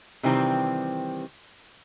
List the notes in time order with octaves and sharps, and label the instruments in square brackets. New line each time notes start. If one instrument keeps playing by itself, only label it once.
[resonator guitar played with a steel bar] C3 D#3 E3 G3 C4